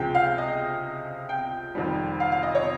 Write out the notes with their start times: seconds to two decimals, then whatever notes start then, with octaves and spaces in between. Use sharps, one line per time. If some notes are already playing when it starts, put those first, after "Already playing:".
Already playing: C#2 C3 F3 G#3 G5
0.15 F5
0.38 D#5
1.29 G5
1.75 F1 F2 D#3 G3
2.20 F5
2.32 F5
2.43 D#5
2.55 C#5